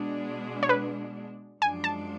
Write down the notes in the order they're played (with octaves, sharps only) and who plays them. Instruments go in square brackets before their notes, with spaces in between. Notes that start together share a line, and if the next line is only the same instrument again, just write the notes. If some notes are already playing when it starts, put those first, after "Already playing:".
Already playing: [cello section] B2 G#3 D4
[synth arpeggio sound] C#5
B4
[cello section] F#2 F3 G#3 D4 [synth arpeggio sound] G#5
[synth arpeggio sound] A5